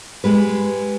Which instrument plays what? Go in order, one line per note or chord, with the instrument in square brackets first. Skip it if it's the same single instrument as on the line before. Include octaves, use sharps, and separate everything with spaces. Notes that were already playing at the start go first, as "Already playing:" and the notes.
[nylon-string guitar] G3 G#3 B4